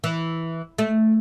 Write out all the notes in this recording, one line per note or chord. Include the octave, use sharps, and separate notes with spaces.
E3
A3